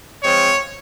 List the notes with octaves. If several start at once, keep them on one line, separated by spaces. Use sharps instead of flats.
F3 G#3 C4 F4 C#5